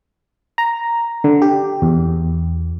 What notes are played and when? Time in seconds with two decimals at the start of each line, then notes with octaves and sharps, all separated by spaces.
0.58 A#5
1.24 D3
1.42 G4
1.82 E2